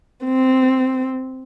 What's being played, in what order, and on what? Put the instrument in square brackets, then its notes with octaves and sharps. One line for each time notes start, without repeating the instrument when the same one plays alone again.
[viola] C4